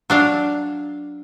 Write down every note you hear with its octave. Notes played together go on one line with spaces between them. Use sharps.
F#3 D4 F5